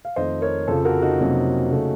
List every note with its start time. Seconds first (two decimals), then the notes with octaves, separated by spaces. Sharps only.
0.05 F5
0.16 F2 D#3 A3 C4 C5 D#5
0.42 A#4 C#5
0.67 F2 C#3 F3 A4 C5
0.85 F#4 A#4
1.02 D#4 F#4
1.20 F2 C3 F#3 A#3 C#4
1.71 C#3 A3 C#4